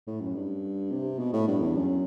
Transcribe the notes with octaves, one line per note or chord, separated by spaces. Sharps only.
A2
F#2
G2
C3
B2
A2
G2
E2
F#2